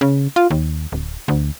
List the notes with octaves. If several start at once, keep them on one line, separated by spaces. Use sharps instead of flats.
C#3
F4
D#2
D1
D2